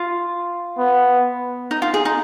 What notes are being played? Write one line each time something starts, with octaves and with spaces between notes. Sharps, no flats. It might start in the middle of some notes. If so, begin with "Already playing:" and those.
Already playing: F4
B3
D#4
F4
G#4
D#4